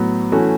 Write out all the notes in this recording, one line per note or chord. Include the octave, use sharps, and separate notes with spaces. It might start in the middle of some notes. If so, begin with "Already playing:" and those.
Already playing: A2 F#3 B3
E3 A3 C#4 F#4